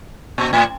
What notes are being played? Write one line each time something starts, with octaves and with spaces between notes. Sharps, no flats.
A#2
A2